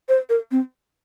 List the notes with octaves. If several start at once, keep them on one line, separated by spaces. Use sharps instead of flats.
C5
A#4
C4